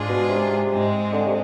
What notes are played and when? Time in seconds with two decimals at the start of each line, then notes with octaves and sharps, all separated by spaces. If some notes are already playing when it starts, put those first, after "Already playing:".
Already playing: G#2 G#3 D4 F4 G#4
0.09 B2
0.29 C3
0.72 G#2 G#3 C4
1.13 D3
1.26 C3